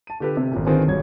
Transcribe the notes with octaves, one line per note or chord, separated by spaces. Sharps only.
A5 D#7
D3 F4 G4 A4 B4
C3
G#1 A#2
D3 D#3 C4 F4 G#4 B4
G#1 F#3 G3 C#5 G#6